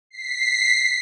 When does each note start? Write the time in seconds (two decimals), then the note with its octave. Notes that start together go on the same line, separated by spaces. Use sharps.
0.10 B6 C7